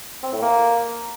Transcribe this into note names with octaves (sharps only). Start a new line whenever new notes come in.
C4
A2
A#3